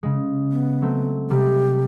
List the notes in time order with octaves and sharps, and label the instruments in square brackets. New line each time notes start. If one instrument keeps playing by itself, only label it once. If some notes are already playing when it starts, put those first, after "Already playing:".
[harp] C#3 G#3
[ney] B3
[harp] F#3 A3 C4
[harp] C3 G3 G#3 [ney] G4